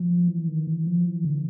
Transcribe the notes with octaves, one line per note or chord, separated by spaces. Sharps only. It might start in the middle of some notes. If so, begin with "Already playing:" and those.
Already playing: F3
E3
D#3
E3
F3
E3
D3